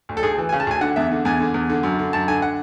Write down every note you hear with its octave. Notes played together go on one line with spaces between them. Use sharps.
D2
A4
D2 G#4
E3
G#5
C#3
A5
D2 G#5
D3 F#5
E2 E5
D3
E2 G#5
D3
E2
D3
F#2
D3
F#2 A5
D3 G#5
F#5